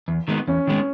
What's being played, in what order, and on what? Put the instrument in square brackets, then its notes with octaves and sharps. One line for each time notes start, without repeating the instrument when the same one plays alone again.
[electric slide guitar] E2
D#3 G#3 B3
[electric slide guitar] E2 [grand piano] C#4
[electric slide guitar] D#3 G#3 B3